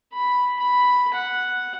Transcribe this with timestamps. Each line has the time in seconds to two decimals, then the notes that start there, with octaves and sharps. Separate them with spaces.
0.13 B5
0.59 B5
1.14 F#5